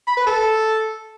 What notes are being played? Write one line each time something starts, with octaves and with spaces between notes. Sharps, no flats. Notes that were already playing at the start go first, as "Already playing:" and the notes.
B5
B4
A4